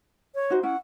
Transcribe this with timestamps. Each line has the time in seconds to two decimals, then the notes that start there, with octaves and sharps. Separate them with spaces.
0.35 C#5
0.50 D#4 F#4 C5
0.63 C#4 E4 F#5